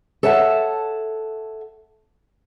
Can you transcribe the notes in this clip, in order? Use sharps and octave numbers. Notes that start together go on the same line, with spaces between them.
A4 C#5 E5 F#5 A5